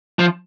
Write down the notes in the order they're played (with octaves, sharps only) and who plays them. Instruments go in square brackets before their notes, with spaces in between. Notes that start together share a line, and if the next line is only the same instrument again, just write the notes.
[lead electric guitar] F3